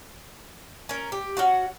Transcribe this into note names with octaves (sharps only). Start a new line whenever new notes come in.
C#4 A#4
G4
C#4 F#4 F#5